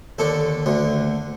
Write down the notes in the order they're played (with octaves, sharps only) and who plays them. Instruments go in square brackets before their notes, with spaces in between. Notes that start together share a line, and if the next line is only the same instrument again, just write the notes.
[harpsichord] D#2 D3 A4
D2 D3